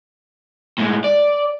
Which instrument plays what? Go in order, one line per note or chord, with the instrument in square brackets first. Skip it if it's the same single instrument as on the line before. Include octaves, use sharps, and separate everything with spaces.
[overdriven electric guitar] A2 G#3
D5